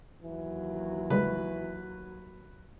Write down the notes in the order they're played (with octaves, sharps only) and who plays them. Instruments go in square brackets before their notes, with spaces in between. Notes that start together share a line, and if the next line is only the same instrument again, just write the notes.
[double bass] D#2 F#3 [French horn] E3
[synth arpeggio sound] C#3 G3 G#3 [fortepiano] B4